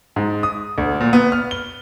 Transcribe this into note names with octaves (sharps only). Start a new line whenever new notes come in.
G#2
D#6
D2
A#2
B3
F6
G7